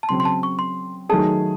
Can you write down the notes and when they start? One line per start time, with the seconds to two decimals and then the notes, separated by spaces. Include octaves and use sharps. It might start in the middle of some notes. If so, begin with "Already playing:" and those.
0.03 A5
0.09 C#3 F#3 C4 C6
0.20 C6
0.25 A5
0.43 C#6
0.59 C6
1.09 D#3 F#3 A3 D#4 G#4 A5